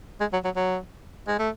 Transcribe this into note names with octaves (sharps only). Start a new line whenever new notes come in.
G#3
F#3
F#3
F#3
G#3
A3